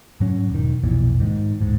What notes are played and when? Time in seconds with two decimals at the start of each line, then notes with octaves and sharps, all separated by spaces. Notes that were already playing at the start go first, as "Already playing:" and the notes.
0.20 G#2 F#3 C#4
0.50 E1 D#3
0.84 B1 F2 A#2 E3
1.20 G#2 D#3
1.60 D1 G#2